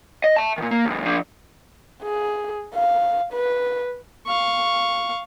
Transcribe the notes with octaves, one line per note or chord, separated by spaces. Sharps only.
D#5
E5 A5
A#2 D#3
A#3
D2 G2
F3 D4
G#4
F5
B4
F5 C#6